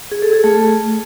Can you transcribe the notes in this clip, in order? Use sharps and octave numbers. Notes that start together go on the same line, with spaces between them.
G#4
A4
G#4
A3